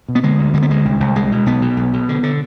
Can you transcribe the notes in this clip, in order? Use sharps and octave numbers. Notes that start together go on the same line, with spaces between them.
B2
B3
D3 G#3
D2
D3 G#3
B3
D2 G#3
C2
C2
C2 G#3
B2
B1 B3
B2
B1
B2
D3
D3